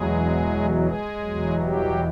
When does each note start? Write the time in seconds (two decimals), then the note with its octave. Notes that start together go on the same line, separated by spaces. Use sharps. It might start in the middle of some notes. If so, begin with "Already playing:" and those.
Already playing: E2 B2 F#3 G#3 G#4
0.78 G#3 G#4
1.20 E2 B2 F#3
1.62 G3 G4